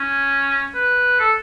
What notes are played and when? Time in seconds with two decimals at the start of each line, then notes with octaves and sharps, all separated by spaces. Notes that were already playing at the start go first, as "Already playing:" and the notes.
Already playing: C#4
0.74 B4
1.19 A4